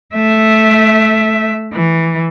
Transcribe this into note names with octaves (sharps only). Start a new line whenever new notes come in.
A3 E5
E3